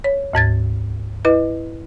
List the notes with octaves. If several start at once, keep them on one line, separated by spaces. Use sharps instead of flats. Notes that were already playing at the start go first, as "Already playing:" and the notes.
C#5
D2 G#2 G#6 A6
E4 B4 D#5